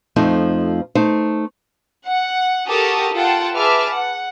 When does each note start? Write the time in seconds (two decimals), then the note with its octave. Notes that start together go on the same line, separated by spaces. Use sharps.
0.16 F2 F3 A3 C4 D#4
0.95 A3 D#4 C5
2.05 F#5
2.68 F#4 G4 A4 A#4 A5 D#6
3.13 F4 A4 F#5 G5 A5
3.55 G#4 B4 E5 A5 D6 F6
3.93 F#5